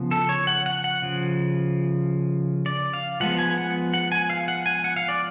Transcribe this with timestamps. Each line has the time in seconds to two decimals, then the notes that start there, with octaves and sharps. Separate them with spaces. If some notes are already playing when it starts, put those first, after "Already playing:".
Already playing: C#3 F3 B3
0.11 A4
0.29 C#5
0.47 F#5
0.66 F#5
0.84 F#5
1.02 C#3 F3
2.66 D5
2.94 F5
3.20 F3 G#3 B3 F#5
3.39 G#5
3.58 F#5
3.94 F#5
4.12 G#5
4.30 F5
4.48 F#5
4.66 G#5
4.84 F#5
4.96 F5
5.09 D5